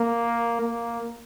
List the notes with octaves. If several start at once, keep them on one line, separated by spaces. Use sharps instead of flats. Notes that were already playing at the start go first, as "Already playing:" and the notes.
Already playing: A#3
A#3